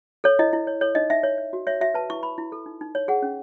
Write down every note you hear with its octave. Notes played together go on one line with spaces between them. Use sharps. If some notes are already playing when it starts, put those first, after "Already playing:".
A4 C#5
E4 D#5
E4
C#5
A4 C#5
D#4 D#5
D#4 E5
C#5
C#5
F#4
C#5 E5
F#4 E5
B4 A5
E4 C#6
B4 B5
E4
A4
D#4
D#4
C#5
G#4 F#5
C#4